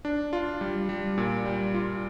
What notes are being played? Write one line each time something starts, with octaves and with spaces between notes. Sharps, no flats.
D4
F4
G3
G3
A#2
G3
F4